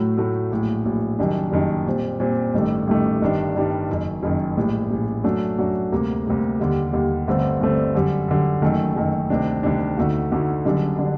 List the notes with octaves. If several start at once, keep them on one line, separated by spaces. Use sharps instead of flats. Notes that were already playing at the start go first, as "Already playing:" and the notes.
Already playing: A2 F#3 A3
A2 F#3 A3
A#1 A2 F#3
A#1 A2 F#3
F#1 F#2 D#3 G3 D4
F#1 F#2 D#3 G3 D4
A#2 G3 C4
A#2 G3 C4
A1 G2 D#3 A3
A1 G2 D#3 A3
G1 G2 D#3 G3 D4
G1 G2 D#3 G3 D4
F#1 F#2 D#3
F#1 F#2 D#3
A#1 A2 G3
A#1 A2 G3
F#2 F#3 A3 D4 F#4
F#2 F#3 A3 D4 F#4
D2 C3 G3 A#3
D2 C3 G3 A#3
D#2 D3 G3
D#2 D3 G3
G1 G2 D3 A3 C4
G1 G2 D3 A3 C4
F#2 D3 G3
F#2 D3 G3
F#1 F#2 D#3 A3
F#1 F#2 D#3 A3
D2 C3 D#3 G3 D4
D2 C3 D#3 G3 D4
D2 D3 A3 D#4 F#4
D2 D3 A3 D#4 F#4
F#1 F#2 D3 G3 D4
D3 G3 D4